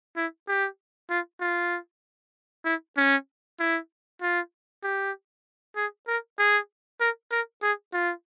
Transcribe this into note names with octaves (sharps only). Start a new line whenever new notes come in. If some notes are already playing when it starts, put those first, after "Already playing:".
E4
G4
F4
F4
E4
C#4
E4
F4
G4
G#4
A#4
G#4
A#4
A#4
G#4
F4